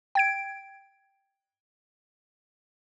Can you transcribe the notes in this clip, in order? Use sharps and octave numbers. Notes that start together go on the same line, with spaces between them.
G5 G#6 D7